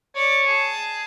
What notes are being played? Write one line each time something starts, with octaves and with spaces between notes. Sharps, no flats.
C#5 D5
G#4 A5